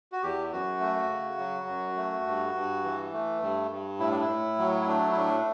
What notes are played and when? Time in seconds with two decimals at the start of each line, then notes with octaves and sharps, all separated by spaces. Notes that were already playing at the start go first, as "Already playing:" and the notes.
0.12 F#4
0.23 E2 G4
0.52 F#2 F#4
0.80 A3
1.09 C#3
1.39 F#3
1.68 F#2
1.96 A3
2.26 G2
2.55 G2
2.84 E3
3.13 A3
3.42 G2
3.71 G2
3.99 A2 E4
4.11 D4
4.20 E4
4.29 A2
4.58 F#3
4.80 E4
4.87 A3 D4
5.12 E4
5.16 A2 D4